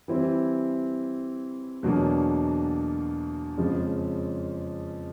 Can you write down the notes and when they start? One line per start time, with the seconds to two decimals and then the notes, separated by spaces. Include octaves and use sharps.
0.08 E3 G3 C4 E4
1.83 E2 B2 F#3 A#3 D4
3.57 F2 C#3 F3 G#3 C#4